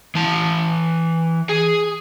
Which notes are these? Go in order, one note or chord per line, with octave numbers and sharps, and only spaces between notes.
E3 A5
G#4